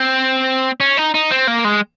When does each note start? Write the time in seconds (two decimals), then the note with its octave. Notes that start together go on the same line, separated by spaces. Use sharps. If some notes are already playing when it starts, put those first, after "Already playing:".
Already playing: C4
0.80 C#4
0.97 D#4
1.14 D#4
1.31 C4
1.48 A#3
1.64 G#3